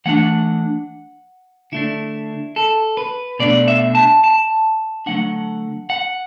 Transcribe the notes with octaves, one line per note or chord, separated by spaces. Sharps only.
E3 A3 D4 F#5
D3 A3 D4 E4
A4
B4
B2 A3 D4 D5
E5
A5
A5
D3 F#3 A3 D4 F#5
F#5